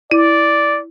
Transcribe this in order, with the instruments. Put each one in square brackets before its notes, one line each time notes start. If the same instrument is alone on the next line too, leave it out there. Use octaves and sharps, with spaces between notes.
[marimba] E4 [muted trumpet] D5